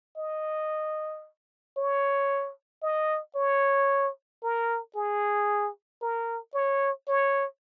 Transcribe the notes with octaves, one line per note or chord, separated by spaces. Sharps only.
D#5
C#5
D#5
C#5
A#4
G#4
A#4
C#5
C#5